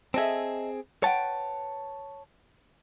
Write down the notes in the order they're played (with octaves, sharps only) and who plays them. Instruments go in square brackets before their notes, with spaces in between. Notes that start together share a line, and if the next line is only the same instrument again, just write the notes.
[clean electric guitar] C4 G#4 [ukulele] A4 D#5 E5
[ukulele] B4 F#5 G5 [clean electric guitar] C#5 A5